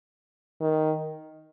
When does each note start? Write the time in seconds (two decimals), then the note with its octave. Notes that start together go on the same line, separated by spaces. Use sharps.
0.61 D#3